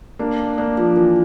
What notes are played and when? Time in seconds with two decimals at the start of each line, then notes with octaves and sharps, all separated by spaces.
0.19 A#3 D4
0.58 A#3 D4
0.78 F3
0.97 E3